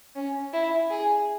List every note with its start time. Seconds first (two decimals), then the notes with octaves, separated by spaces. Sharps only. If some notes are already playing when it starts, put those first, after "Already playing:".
0.15 C#4
0.53 E4
0.90 G#4